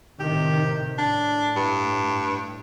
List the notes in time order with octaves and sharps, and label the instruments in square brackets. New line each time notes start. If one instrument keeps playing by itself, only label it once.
[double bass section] A2 C3 D#3 [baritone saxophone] G4
[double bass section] A2 [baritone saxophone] D4
[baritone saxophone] G2